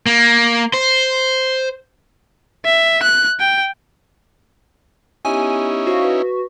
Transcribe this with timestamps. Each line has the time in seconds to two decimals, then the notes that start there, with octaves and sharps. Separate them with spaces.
0.06 A#3
0.74 C5
2.66 E5
3.03 F#6
3.40 G5
5.25 B3 C#4 D#4 E4 G4 G#5
5.87 F#4 C5 F5
6.02 B4 C#6